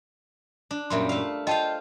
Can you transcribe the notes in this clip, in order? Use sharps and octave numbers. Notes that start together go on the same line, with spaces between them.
D4
F#2 A#2 G3 E5 C6
A3 F5
F4 C5 D#5 F5 G5 A5